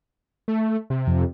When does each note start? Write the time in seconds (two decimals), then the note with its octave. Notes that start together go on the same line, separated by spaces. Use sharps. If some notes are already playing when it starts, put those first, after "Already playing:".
0.48 A3
0.90 C3
1.07 F2